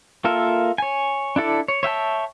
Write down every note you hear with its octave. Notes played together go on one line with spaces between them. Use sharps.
A#3 F4 A4 A#4 E5
C#5 G#5
D4 E4 A4 D5
C#5
C#5 E5 G5 A5